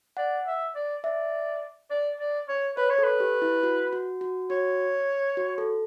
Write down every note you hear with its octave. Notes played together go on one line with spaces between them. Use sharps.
D5 F#5
E5
D5
D5 E5
D5
D5
C#5
B4 C#5
C#5
A4
B4
G4
E4
F#4
F#4
F#4
F#4 C#5
F#4
A4